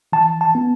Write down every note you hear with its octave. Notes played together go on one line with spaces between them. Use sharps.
E3 A5
A5
B3